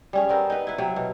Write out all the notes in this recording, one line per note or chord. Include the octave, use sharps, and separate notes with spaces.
G3 C#4 G#4
B3 C4 A#4
D#4 B4
E4 B4
C3 F#3
B2